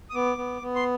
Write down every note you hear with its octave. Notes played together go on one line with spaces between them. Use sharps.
D#6
B3 D6
B3
B3
C6